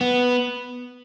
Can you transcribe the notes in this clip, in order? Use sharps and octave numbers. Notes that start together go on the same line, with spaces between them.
B3